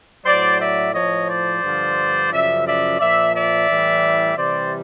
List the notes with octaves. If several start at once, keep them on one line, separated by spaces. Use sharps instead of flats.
A2 F#3 C5 D5
D5 E5
A2 F3 C#5 D#5
C5 D5
G2 D3 F3
F#2 C#3 F3 D5 E5
D5 E5
A#2 F3 D5 E5
D5 E5
A2 E3 G3
C3 E3 G3 C5 D5